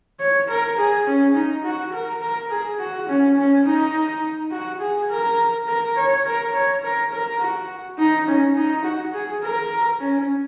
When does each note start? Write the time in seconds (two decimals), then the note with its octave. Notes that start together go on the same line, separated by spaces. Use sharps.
0.20 C#5
0.48 A#4
0.77 G#4
1.06 C#4
1.35 D#4
1.65 F#4
1.93 A#4
2.22 A#4
2.50 G#4
2.79 F#4
3.09 C#4
3.37 C#4
3.66 D#4
4.52 F#4
4.81 G#4
5.10 A#4
5.67 A#4
5.97 C#5
6.26 A#4
6.54 C#5
6.83 A#4
7.12 A#4
7.40 F#4
7.98 D#4
8.27 C#4
8.56 D#4
8.85 F#4
9.14 G#4
9.43 A#4
10.00 C#4